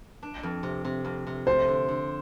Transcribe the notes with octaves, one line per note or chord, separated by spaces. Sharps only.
D4
F2
C3
C3
F2
C3
A3 C5
D3
D3